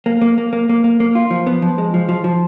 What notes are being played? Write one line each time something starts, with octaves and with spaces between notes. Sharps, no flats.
A#3
A#3
A#3
A#3
A#3
A#3
A#3
F4
F3
B3
F3
G#3
F3
F3
F3